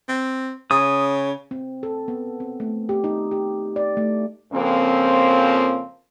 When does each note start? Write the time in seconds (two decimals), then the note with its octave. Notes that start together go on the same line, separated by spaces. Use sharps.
0.09 C4
0.71 C#3 D#6
1.51 C4
1.83 A4
2.08 B3
2.40 C4
2.60 A3
2.89 G4
3.04 D#4
3.31 G4
3.76 D5
3.97 A3
4.52 F2 C#3 F3 A#3 C4